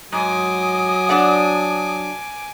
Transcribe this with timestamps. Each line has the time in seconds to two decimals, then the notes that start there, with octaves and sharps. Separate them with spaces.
0.12 G#2 F#3 G#5 D6 D#6
1.09 D4 D5 F#5